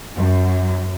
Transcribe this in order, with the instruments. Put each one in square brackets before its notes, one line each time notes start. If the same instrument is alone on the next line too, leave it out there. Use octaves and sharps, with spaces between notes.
[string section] F#2